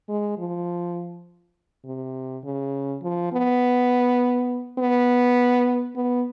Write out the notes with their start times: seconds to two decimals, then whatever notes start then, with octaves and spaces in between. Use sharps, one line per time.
0.09 G#3
0.38 F3
1.85 C3
2.44 C#3
3.02 F3
3.32 B3
4.79 B3
5.96 B3